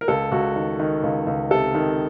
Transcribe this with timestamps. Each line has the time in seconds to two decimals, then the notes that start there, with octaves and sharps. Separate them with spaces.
0.01 A#4
0.08 C#2 A4
0.32 C#2 F#4
0.56 D#3
0.80 D#3
1.03 C#2
1.27 C#2
1.51 C3 A4
1.75 D#3